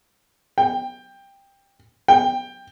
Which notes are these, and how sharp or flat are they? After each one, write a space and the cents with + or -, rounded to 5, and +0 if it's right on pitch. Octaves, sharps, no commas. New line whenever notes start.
G5 +15
G5 +15